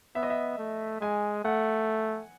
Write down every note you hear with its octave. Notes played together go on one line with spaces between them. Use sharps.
B3 E5
D#5
E5
A3
G#3 G#5
A3 F#5